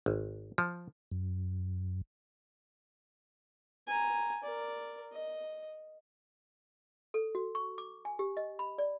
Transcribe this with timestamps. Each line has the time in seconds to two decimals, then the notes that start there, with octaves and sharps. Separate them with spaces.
0.06 G#1
0.58 F3
1.11 F#2
3.88 G#5 A#5
4.44 A#4 D5
5.12 D#5
7.14 A4
7.35 F#4
7.55 C#6
7.78 D6
8.05 G#5
8.19 G4
8.37 D#5
8.59 B5
8.78 D5